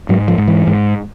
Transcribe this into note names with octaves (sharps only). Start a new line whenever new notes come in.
G#2 F#3
F3
G#2
E3
G#2